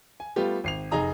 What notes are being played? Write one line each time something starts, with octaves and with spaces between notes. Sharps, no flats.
G#5
G3 A3 B3 F4 G4
G#1 C7 F7
F1 D#4 G#4 A#5 D#6